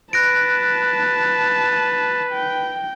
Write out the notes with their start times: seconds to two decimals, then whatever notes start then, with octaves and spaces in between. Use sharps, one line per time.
0.13 B4 A5 F#6 A#6 D7
2.33 G5